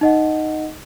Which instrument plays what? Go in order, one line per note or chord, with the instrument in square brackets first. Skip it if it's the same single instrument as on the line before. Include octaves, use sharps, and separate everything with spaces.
[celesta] D#4 D#5 F#5